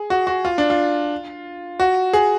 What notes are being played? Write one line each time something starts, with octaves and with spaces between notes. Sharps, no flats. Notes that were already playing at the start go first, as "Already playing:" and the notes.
Already playing: G#4
F#4
F#4
F4
D4
F4
F#4
G#4